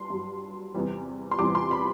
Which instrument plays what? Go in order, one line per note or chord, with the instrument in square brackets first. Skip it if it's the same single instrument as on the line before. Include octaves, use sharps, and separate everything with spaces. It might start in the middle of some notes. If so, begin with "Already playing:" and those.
Already playing: [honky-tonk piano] G2 C6
G2 F#3
E2 C3 E3 G3
C6
E2 C3 E3 G3 D6
C6
B5